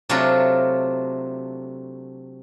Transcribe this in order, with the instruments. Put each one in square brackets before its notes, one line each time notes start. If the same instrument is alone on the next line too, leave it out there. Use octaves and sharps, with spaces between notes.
[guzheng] C3 F#3 A3 D4 F4 F#4